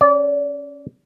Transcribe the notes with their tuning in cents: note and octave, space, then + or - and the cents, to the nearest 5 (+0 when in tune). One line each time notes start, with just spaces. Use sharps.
C#4 +0 D5 -30